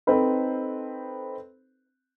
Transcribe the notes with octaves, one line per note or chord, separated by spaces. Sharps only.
C4 D#4 A4 B4 C5